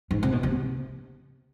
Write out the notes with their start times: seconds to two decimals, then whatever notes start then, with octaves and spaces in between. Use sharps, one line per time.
0.11 G#2
0.23 C3
0.32 B2
0.43 C3